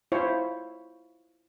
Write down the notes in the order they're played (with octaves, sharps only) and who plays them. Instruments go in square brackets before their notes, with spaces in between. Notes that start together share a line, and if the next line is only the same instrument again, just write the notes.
[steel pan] E4 F4 C5 C#5